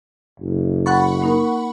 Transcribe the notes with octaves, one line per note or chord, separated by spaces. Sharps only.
F#1
F#5 G#5 B5 C#6 F#6 A6
A#3 D#4 A#4